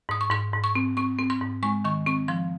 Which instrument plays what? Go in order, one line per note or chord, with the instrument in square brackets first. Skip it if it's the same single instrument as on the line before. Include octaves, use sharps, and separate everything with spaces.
[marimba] G#2 D#6
C#6
G#2 C6
G#2
C#6
C4
C4 C#6
C4
C6
G#2
G#3 C#6
D#3 C#6
C4 C#6
F3 C6